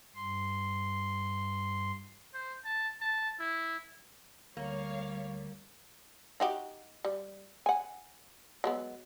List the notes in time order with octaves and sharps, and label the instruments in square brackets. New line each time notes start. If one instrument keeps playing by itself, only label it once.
[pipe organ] G2 C6
[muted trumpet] C5
A5
A5
E4
[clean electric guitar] D2 [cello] G3 [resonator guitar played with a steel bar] A#3 [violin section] C#5 F5
[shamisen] D#4 F#4 G4
G3
F#5 G#5
F#3 G#3 B3